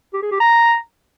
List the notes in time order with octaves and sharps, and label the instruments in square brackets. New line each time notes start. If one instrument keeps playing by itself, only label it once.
[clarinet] G4
G#4
G4
A#5